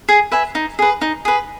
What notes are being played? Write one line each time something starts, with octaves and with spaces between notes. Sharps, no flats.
G#4
B4 E5 G#5
D#4
G#4 B4
D#4
G#4 B4